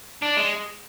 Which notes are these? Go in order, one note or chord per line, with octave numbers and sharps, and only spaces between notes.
D4
G#3